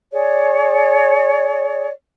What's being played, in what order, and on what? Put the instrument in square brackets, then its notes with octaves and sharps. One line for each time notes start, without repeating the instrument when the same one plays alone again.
[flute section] G#4 C#5 D5